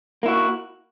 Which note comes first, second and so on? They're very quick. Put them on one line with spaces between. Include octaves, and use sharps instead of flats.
A#3 E4 F#4